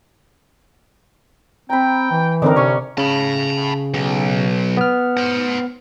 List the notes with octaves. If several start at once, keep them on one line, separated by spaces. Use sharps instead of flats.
C4 G5 A#5 B5
E3
D3 C4 D4 D#4 A#4
C3 C#4 D4 C#5 C#6
C#3 A5 B5
B1
B3 F6
C5 F#5